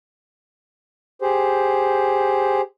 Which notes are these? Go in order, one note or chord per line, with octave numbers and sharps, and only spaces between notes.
G4 G#4 C5